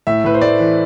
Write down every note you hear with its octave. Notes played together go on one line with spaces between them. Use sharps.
A2 E5
A2 B4
C5
A3 D5
E3